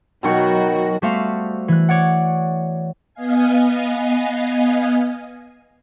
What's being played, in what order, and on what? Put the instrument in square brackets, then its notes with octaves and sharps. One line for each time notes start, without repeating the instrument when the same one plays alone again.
[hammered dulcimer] B2 D#3 C#6 [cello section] F#3 F#4
[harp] G3 A3 B3 F#4 C5 F5
E3 F#6
C#5 D5 F#5
[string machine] B3 D#5 F5 G#5